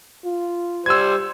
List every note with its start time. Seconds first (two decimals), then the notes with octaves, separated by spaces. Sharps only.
0.25 F4
0.86 G3 C5 E6 G#6